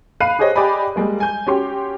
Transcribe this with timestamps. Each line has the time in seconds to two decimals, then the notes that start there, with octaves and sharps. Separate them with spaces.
0.20 F5 B5 F#6 C7 D#7
0.39 G4 G#4 C5 C#5 D#5
0.56 G4 D5 D#5 G#5 B5
0.96 G3 G#3 A#3
1.20 G#5 G6
1.47 C#4 F#4 G4 C6